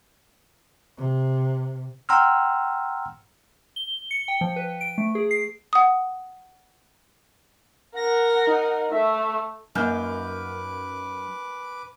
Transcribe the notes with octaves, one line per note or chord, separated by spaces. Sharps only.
C3
F#5 G5 A#5 C6 E6 F6
G7
C#7
G5
F3
B4
D7
A3
G#4
C7
F#5 D#6
A#4 F#5 A#6
D#4
A3 E5
F#2 A#3 D#4 B4 G#5 D6 F6 G6